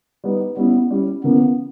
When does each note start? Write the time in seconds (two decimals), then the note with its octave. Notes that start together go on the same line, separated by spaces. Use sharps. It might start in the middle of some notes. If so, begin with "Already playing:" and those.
0.24 G3 B3 D#4
0.57 G3 B3 C#4 E4
0.90 G3 C#4 E4
1.24 C#3 E3 A#3 B3 C#4